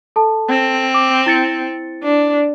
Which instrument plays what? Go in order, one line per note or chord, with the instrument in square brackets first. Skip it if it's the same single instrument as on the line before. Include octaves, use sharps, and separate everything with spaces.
[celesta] A4 A5
[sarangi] C4
[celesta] D6
E4 A6 C#7
[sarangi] D4